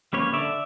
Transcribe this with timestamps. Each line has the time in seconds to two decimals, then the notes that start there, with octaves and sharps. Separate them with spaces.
0.13 G3 A#3 C#4 B4 C#5
0.33 D3 D5 E5